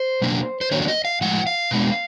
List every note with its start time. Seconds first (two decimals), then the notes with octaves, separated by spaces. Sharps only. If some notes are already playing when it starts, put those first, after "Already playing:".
Already playing: C5
0.22 B2 F#3 A#3 D4
0.61 C5
0.71 D#3 F#3 A#3 D4 C#5
0.82 D5
0.88 D#5
1.05 F5
1.21 A2 F3 G#3 F#5
1.47 F5
1.71 B2 G#3 B3 D4